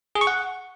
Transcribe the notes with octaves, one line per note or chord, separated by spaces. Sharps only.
G#4
C#6
F#5